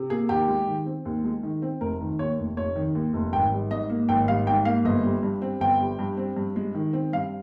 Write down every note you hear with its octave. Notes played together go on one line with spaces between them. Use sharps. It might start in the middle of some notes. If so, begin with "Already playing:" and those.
Already playing: C3
A#3 G#4
D#2 G4
G#3
D#3
C4
D#2
G#3
D#3
C4
F1 A#4
D#3
D#2 C#5
F1
F1 C#5
D#3
D#2
F1
G#1 G5
G3
G#2 D#5
A#3
G#1 G5
G3 F5
G#2 G5
A#3 F5
G1 D#5
G3
G2
C4
G1 G5
G3
G2
C4
G2
G#3
D#3
C4
G2 F5